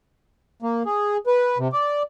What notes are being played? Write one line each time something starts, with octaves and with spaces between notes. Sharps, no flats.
A#3
G#4
B4
C3
D5